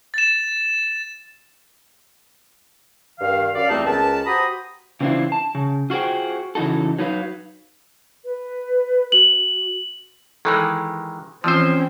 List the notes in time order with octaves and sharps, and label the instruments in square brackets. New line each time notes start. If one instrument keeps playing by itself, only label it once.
[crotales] A6 E7
[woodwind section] G2 D#3 F5
F#2 D5 F5
E2 G3 A3 C4 D#4 A5
C#2 A#4 B4 A5
F#4 G4 C5 A#5 B5 D#6
[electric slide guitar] C#3 E3 C4 D4 E4 F4
A5
C#3
F4 F#4 G#4 C5 G5
C#3 E3 D#4 F#4 A4
F#3 D#4 B4 F5
[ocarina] B4
[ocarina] F#4 [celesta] F#7
[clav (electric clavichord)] D#3 E3 G#3 [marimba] A4
[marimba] E3 F4 E6 [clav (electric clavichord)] F3 C5 [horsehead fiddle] C4 C#4